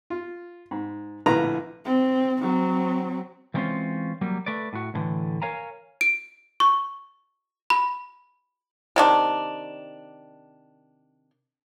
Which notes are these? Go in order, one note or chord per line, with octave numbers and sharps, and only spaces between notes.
F4
G#2
A#1 A2 D3 B4 F5 A#5
C4
F#3 C4
E3 G3 G#3 C4 C#4 F4
F#3 G3 A#3
A3 B4 D5
A2 F#4
D#2 A2 D3 E3
A#4 C#5 F5 G#5 A#5
D7
C#6
B5
C3 D#3 D4